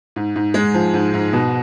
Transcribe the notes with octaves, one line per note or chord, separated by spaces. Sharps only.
G#2
G#2
G#3
F3
G#2
G#2
B2